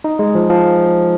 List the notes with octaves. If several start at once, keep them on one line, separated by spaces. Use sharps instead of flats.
D#4
G#3
F3
F3